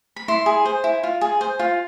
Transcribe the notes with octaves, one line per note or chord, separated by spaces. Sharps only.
B5
E4 C6
G#4
C5
E4
F4
G#4
C5
F4